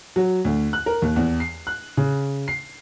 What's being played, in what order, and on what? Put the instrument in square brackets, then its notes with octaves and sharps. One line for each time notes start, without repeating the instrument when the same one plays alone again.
[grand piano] F#3
D2
F#6
A#4
D#2
E2
C7
F#6
C#3
C7